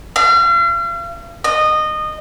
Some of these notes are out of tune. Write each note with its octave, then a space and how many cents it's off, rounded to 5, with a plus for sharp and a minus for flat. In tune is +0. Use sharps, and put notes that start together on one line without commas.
F5 -40
D#5 -20